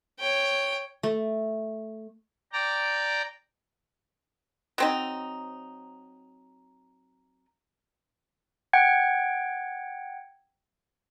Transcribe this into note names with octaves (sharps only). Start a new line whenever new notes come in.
C#5 G5
A3
D5 G5 A#5
F#3 C4 D#4
F#5 G5 G#6